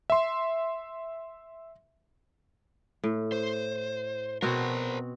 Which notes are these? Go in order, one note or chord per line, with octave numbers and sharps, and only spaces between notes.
E5 C6
A2
C5
B2 C4 F#4 A#4 C5